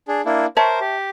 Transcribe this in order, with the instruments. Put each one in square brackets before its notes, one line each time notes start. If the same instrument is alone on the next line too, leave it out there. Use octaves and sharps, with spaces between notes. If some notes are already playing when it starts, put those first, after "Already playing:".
[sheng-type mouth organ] D4 G#4
A#3 D4 E4
[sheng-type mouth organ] A#4 C5 [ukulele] C#5 E5 A5
[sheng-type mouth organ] G4